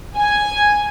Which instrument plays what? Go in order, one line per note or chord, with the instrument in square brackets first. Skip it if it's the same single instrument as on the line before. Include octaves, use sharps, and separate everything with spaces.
[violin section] G#5